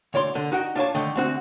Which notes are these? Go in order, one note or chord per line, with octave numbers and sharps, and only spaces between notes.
D2 C#5 D5 C6
D3
D#4 F#4 F#5 G5
D4 F4 C#5 A5
D3 D#3 A3 D#5
D2 C4 F#4